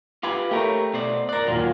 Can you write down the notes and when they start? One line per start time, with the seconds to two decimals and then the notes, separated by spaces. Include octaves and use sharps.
0.23 F4 G4 B4 D6 G#6
0.51 A3 G4 A#4 C#5
0.94 B2 C5 D5
1.29 A#4 D5 F#6 A6
1.47 D#2 A#2 F#3 F4 F7